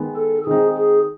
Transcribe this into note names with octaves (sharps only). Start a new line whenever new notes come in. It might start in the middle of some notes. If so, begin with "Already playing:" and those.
Already playing: D#3 G#3 B3
A4
D#3 G#3 C4 D#4 G#4
G#4